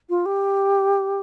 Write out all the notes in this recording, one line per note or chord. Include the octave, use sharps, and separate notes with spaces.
F4
G4